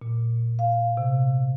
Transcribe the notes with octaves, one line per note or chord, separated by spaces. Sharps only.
A#2
F5
C3